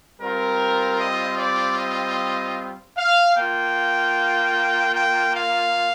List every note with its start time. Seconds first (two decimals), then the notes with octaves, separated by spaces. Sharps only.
0.20 G3 C4 F4 A#4
0.99 D#5
1.39 D5
1.78 D#5
2.97 F5
3.36 A#3 G5
3.41 F4
4.95 G5
5.35 F5